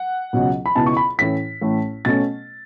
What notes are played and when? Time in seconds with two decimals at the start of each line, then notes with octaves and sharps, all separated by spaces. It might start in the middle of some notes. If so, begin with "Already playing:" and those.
Already playing: F#5
0.33 C#2 B2 F#3 C#4
0.66 B5
0.76 C#2 B2 B3 E4 A5
0.86 C#6
0.97 B5
1.18 A2 E3 C#4 E4 B6
1.61 A1 A2 A3
2.05 B2 A3 C#4 A6